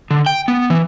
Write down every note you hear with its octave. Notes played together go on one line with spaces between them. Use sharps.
D3
G5
B3
E3